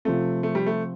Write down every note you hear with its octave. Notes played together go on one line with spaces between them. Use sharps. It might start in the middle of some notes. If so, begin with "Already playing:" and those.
C3 F3 A3 C4 F4
A3
G3
A3